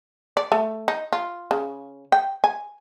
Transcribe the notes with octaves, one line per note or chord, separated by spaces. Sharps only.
D5
A3
D#4
F4
C#3
G5
G#5